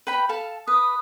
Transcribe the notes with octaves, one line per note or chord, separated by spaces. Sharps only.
B4 G5 B5
A4 F5 A5
B4 D#6